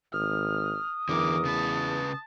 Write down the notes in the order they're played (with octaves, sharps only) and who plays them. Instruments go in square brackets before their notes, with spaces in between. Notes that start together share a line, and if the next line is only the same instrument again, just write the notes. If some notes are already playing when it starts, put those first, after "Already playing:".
[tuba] G#1 [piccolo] D#6 [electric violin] F6
[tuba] E2 [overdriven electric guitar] D3 E3 [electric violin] A#4 D6
[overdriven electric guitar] C#3 B4 [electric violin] A5